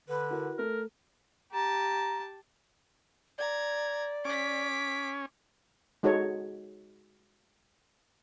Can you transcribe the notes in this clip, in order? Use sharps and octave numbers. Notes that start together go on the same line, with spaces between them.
D3 B4
E4 F#4 A#4
A3 A#4
G4 A5 A#5
D5 A#5 G#6
C#4 D6 B6
G#3 D#4 F#4 A4 C#5